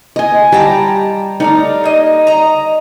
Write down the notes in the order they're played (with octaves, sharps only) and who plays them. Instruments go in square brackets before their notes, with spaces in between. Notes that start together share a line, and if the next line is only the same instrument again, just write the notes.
[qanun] D#5 G#5
[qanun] G3 [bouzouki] G5 A5 A#5
[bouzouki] A3 D5 F5 [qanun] D#4
[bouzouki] A#3 D#5
D#5 A#5